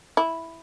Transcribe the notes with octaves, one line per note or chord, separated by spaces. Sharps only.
E4